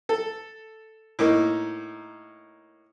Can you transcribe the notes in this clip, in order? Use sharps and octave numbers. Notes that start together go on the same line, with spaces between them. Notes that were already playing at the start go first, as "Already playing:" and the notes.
A4
A2 A#3 D#4